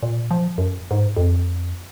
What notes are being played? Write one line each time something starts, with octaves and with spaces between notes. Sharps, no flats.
A#2
F3
F#2
G#2
F2